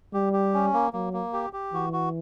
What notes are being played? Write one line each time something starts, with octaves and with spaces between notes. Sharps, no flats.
G3 G4
G4
C#4
A#3
F#3 A#3
A#3
G4
G4
E3 F#4
F#4